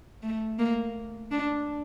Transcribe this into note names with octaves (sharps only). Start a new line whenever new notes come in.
A3
A#3
D4